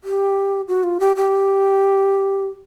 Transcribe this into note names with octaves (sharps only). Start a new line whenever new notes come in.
G4
F#4
F4
G4
G4